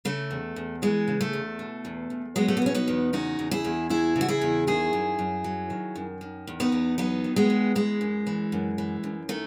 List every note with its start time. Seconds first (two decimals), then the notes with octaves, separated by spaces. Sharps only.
0.05 C#3 A3
0.31 E2
0.56 E2
0.82 E3 G#3
1.08 C#3
1.21 A3
1.33 E2
1.59 B2
1.85 E2
2.10 E2
2.36 F#3 G#3 B3
2.48 A3
2.57 B3
2.62 B2 C#4
2.75 B3 D#4
2.88 E2
3.13 C#3 D#4 F#4
3.39 E2
3.51 E4 G#4
3.65 E2
3.90 E3 E4 G#4
4.16 C#3
4.21 F#4
4.28 E4 G#4
4.42 E2
4.67 D#3 E4 G#4
4.93 F#2
5.19 F#2
5.44 F#3
5.70 D#3
5.96 F#2
6.21 D#3
6.47 E2
6.60 B3 D#4
6.72 E2
6.98 F#3 B3 D#4
7.24 D#3
7.36 G#3 B3
7.50 E2
7.75 E3 G#3
8.01 F#2
8.27 E3
8.52 F#2
8.78 E3
9.04 F#2
9.29 D#3 A3